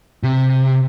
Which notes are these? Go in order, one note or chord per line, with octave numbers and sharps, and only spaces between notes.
C3